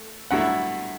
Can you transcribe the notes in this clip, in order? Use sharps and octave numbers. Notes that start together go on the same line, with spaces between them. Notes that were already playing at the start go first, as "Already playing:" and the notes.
Already playing: A3
G2 F#3 A3 E4 F#5